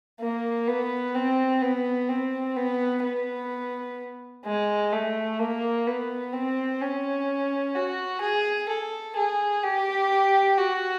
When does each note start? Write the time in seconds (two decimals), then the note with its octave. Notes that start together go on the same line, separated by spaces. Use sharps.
0.21 A#3
0.68 B3
1.15 C4
1.62 B3
2.09 C4
2.56 B3
3.03 B3
4.46 G#3
4.92 A3
5.39 A#3
5.86 B3
6.33 C4
6.81 C#4
7.75 F#4
8.22 G#4
8.69 A4
9.17 G#4
9.64 G4
10.58 F#4